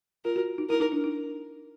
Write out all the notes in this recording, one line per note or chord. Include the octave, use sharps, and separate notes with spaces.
F4 A#4
F#4
D#4
E4 A#4
D#4
D4
D#4